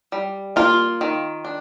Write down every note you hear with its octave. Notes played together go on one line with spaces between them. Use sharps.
G3
A#3 F4
D#3
D4